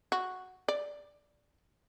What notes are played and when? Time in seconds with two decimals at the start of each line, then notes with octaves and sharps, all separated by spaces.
0.12 F#4
0.68 D5